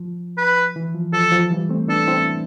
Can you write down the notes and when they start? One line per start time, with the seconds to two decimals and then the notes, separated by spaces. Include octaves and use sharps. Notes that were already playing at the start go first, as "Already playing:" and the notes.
Already playing: F3
0.38 B4
0.76 E3
0.95 F3
1.13 F3 A4
1.32 F3
1.51 E3 G3
1.69 A3 C4
1.88 B3 D4 A4
2.07 C4 E4